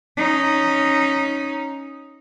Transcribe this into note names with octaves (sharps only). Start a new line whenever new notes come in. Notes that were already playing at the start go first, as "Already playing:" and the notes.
C#4 D#4